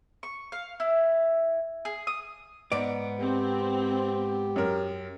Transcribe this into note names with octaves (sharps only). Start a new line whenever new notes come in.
C#6
F5
E4
G#4
D#6
G#2 B3 D5 D7
C4 G4
F#2 A#4